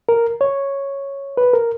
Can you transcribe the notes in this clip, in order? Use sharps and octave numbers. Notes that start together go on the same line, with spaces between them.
A#4
C#5
B4
A#4